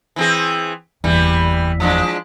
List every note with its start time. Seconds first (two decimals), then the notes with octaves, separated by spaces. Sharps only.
0.16 E3 C4 G#4
1.04 F#1 E2 E3 G3
1.80 F3 G#3 D4